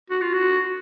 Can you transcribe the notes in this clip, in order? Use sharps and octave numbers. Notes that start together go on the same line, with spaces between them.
F#4
F4
F#4